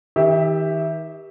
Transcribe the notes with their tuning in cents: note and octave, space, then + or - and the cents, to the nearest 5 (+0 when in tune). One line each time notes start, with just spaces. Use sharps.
D#3 +40 G4 +5 E5 +0